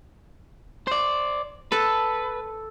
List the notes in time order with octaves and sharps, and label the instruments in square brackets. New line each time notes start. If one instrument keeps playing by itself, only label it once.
[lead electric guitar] C5 D5
[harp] A4 [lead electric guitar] B4